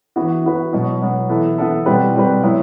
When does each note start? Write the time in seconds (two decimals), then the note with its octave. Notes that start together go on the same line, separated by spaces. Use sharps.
0.16 E3 B3 F#4 B4
0.44 E3 B3 F#4 B4
0.72 B2 F#3 B3
1.01 B2 F#3 B3
1.29 E3 B3 E4 A4
1.58 E3 B3 E4 A4
1.86 B2 G3 C4 G4 B4
2.15 B2 G3 C4 G4 B4
2.43 F#3 B3 E4